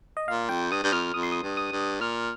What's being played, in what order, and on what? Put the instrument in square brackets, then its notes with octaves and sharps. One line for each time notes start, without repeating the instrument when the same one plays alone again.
[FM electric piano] D#5
[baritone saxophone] A#2 [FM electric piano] F5
[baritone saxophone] F2 [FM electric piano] G5
[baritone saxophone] G2 [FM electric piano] D#6
[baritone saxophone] G2 [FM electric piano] G6
[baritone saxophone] F2 [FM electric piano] F6
[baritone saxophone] F2 [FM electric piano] D#6
[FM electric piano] C6
D#6
[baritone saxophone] G2
[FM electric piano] D#6
[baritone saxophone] G2
[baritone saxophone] A#2 [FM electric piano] F6